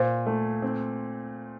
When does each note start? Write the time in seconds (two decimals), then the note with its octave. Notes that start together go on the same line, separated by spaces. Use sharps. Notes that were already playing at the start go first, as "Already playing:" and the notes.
Already playing: A#2 C5
0.26 A3
0.62 C4